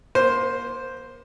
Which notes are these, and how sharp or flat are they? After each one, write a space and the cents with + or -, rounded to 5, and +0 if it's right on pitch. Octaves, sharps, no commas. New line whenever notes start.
A#3 +30 C5 +0